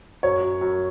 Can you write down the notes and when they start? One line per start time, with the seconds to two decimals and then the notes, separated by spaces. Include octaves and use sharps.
0.23 F#2 C#5
0.43 F#2
0.61 F#2